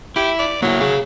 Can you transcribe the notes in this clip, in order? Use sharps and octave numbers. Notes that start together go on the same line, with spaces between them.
E4 G4
D5
F#3 A#3 E4
G#4 F5